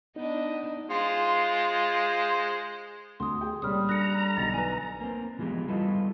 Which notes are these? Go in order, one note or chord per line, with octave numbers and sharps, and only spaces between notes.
B3 D4 D#4 D#5
G#3 F4 C5
D2 C6 D#6
G#4 G5
C#2 A#2 G3 C#5 D#6 F6
D4 A4 A#5 F#6 C#7
B1 D3 D#4 A6
B4 G#5
A#3 C4
E3 F3 G#3 B3 G4
G3 E4 F4 A4 B4 D#5